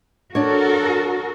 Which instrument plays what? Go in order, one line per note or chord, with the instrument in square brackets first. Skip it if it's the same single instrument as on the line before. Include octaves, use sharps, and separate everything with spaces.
[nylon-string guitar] D4 C#5 [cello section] F#4 A4 A#4